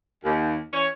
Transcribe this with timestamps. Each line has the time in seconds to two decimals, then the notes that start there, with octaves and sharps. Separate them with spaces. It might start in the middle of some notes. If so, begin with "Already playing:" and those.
0.24 D#2
0.73 E3 C#4 C#5